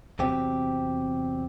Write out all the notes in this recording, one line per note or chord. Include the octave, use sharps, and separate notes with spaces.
E2 C3 F#3 C4 G4